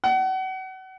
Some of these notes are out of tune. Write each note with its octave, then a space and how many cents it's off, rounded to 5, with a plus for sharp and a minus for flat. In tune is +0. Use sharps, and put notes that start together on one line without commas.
F#5 +35